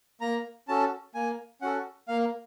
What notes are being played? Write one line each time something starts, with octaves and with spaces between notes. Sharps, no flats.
A#3 A#5
C#4 F#4 A4 A5
A#3 G#5
C#4 F#4 A4 F#5
A#3 F5